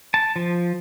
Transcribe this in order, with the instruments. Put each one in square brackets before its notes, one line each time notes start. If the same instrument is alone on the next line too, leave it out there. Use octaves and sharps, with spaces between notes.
[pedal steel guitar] A5
F3